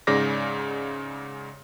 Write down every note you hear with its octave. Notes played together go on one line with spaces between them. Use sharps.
G#2 C#3 D5 D6 A#6